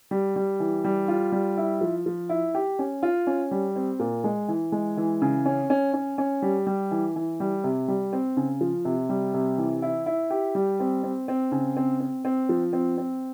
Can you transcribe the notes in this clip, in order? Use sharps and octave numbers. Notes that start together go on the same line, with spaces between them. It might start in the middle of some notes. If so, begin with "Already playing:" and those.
G3
G3
E3
G3
F4
G3
E4
F3
F3
E4
G4
C#4
F4
C#4
G3
C4
A#2
G#3
E3
G#3
E3
C#3
C#4
C#4
C#4
C#4
G3
G3
E3
E3
G3
C3
G3
C4
C#3
F3
C3
G3
C3
E3
E4
E4
G4
G3
C4
C4
C4
C#3
C4
C4
C4
F3
C4
C4